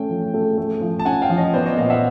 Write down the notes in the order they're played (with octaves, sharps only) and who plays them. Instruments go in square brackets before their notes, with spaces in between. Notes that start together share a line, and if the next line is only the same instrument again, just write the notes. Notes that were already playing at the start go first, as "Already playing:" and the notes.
Already playing: [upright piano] A3 C#4 [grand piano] G5
[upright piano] F3
A3
A3
F3
[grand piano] A5
[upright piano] C#4 [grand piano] F#5 G#5
[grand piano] F5 G5
[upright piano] F3
[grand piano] C#5 D#5
[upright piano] B3 [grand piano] C5 D5
[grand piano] C#5 D#5
[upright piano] A#2 [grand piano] D#5 F5
[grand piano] E5 F#5